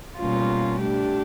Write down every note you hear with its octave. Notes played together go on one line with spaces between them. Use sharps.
B2 G3 A#3 C#4 F4
A3 D4 G4